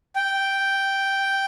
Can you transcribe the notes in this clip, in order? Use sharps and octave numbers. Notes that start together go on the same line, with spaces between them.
G5